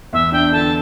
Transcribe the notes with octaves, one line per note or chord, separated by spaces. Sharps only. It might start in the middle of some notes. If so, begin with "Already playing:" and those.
E2 E5
D4 G5
D3 A5